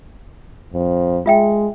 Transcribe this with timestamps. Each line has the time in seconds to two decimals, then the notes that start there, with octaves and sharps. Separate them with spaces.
0.73 F2
1.26 G#3 F4 E5 G5